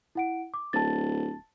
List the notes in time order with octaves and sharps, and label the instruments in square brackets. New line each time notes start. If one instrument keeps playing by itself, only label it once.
[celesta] E4 F#5 D7
D6
[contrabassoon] D1 [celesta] A5 A6